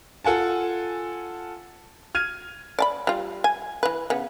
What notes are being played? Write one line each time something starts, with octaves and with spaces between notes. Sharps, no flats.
F4 A4 F#5 G#5 A5
F6 G#6 D#7
D5 A5 B5
G3 F4
G#5
E3 B4
C#3 B3